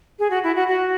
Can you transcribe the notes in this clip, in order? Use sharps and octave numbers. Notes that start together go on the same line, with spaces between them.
G#4
F#4
E4
F#4
F#4